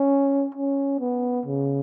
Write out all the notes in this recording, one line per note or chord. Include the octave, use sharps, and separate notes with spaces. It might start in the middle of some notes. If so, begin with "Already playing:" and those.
Already playing: C#4
C#4
B3
C#3